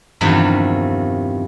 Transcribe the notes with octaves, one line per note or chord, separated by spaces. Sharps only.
E2 G2 C3 D#3 F3